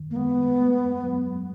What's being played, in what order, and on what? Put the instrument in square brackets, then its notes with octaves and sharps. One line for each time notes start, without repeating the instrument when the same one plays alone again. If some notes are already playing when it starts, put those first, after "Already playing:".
Already playing: [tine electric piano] D#3
[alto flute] A#3
[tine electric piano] G#3 [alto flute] B3
[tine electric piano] A3
F#3